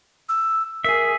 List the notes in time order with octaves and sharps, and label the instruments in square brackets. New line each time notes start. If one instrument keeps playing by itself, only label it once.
[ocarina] E6
[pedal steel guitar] G#4 E5 [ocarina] A#4